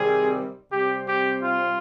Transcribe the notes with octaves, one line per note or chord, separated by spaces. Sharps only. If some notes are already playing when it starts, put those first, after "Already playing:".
Already playing: C3 D#3 G3 C4 G#4
C3 G3 C4 G4
G4
F4